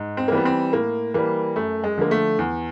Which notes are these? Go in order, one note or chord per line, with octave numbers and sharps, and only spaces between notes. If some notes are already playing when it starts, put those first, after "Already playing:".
Already playing: G#2
C4
A#3
E3 G3 B3
C4
A2 A#3
E3 G3 A#3
F#2 A3
G#3
D3 F3 A#3
A3
E2